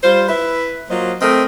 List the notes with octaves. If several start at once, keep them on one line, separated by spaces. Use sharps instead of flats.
G3 F4 C5
E4 B4 E5
F#3 A#3 F4 C5 D#5
A3 C4 A#4 D#5